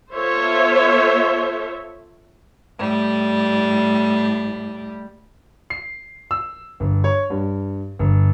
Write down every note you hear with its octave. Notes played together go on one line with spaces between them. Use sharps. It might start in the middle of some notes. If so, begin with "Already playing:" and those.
B3 F4 A4 C5 C#5 E5
A2 G3
C7
E6
G1
C#5
G2
G1